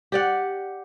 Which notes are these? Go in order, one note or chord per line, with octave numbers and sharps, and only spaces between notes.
G4 D5 F#5